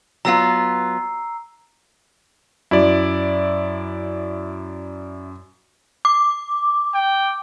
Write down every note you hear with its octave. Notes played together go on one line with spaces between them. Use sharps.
F#3 B3 F4 A#5 E6 C7
F#2 E4 D5
D6
G5